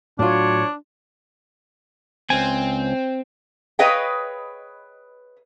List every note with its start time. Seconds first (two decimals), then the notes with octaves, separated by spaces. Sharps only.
0.19 A2 F#3 D4 F4 C#5
2.30 C#2 C4 G#5
3.79 G#4 B4 C#5 D#5 F5 G5